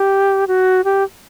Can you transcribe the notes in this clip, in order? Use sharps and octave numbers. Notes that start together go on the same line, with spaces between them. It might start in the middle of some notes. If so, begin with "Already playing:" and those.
Already playing: G4
F#4
G4